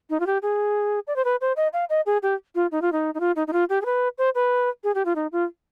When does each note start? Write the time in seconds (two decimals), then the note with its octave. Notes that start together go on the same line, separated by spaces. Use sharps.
0.10 D#4
0.20 F4
0.26 G4
0.42 G#4
1.07 D5
1.16 C5
1.25 B4
1.41 C5
1.56 D#5
1.73 F5
1.90 D#5
2.06 G#4
2.23 G4
2.55 F4
2.72 D#4
2.82 F4
2.92 D#4
3.14 D#4
3.20 F4
3.36 D#4
3.47 D#4
3.53 F4
3.70 G4
3.81 G#4
3.85 B4
4.18 C5
4.35 B4
4.84 G#4
4.95 G4
5.05 F4
5.15 D#4
5.32 F4